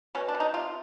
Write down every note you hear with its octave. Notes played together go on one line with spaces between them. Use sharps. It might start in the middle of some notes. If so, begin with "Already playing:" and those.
B2 C#4
D4
B2
D#4
C3 F4